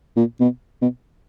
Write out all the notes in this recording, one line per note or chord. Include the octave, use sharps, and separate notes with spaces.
A#2
B2
B2